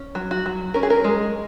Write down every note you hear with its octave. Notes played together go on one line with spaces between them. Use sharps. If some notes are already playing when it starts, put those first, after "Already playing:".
Already playing: C#4
F#3
F#4
F#3
C#4 A#4
G#4
A#4
G#3